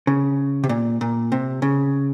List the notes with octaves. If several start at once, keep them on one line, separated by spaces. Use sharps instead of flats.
C#3
C3
A#2
A#2
C3
C#3